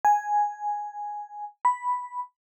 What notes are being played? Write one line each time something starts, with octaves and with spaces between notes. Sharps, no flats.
G#5
B5